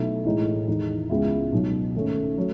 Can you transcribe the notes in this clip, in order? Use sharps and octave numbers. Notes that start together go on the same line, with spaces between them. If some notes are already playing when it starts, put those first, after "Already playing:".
Already playing: B1 B2 A3 E4
A1 A2 G#3 D#4
E2 D#3 G#3 D#4
C#2 C#3 G#3 B3 E4
B1 B2 F#3
G#2 D#3 A3 C#4
F#3 A3